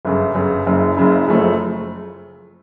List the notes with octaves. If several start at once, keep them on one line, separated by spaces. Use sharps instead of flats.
G1 F#2 C#3
G1 F#2 C#3
F#1 F#2 C#3
F#1 F#2 C#3
F#1 F#2 C#3 F3 A3